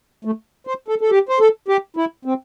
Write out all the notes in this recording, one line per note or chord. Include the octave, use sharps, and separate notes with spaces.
A3
C5
A4
A4
G4
C5
A4
G4
E4
C4